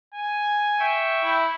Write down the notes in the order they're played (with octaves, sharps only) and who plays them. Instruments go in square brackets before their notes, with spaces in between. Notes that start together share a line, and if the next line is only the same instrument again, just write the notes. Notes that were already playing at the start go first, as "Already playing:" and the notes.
[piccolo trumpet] G#5
[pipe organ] E5 G5 C#6
[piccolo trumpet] E4